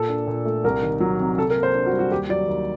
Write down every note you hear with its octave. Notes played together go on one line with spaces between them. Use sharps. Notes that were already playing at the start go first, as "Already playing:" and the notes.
Already playing: A#2 A4
D4
A#2
A3
C2 A#4
D#3
F#3
C3
C3 A4
A#4
A#3
C5
D4
F#4
G3
F#4
D#2 G4
F#3 D5
D#2